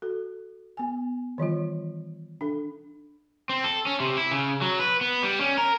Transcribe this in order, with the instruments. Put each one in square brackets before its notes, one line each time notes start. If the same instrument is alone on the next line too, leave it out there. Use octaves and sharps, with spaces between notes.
[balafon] F#4 A4
B3 G#5
D#3 E3 G3 F4
D4 A4
[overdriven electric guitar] C4
A4
C#4
C3
E4
C#3
F#3
B4
B3
G3
C#4
A#4